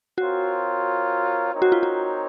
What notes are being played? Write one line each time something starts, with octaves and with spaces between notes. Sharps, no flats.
C4 F4 F#4 A#4 C#5
C4 D#4 A#4 C#5
F#4
F4
F#4